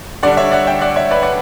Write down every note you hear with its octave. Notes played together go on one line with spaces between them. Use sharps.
D3 G3 D4 D5 F#5
C#5 E5
D5 F#5
E5 G5
D5 F#5
C#5 E5
B4 D5
D5 F#5